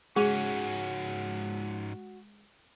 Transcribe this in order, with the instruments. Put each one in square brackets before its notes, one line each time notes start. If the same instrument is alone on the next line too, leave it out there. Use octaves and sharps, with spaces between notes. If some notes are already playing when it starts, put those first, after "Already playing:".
[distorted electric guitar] G#2 C#4 [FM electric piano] G#3 [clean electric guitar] F#4 [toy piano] G#4